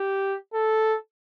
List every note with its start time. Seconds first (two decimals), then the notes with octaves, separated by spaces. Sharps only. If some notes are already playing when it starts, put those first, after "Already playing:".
Already playing: G4
0.54 A4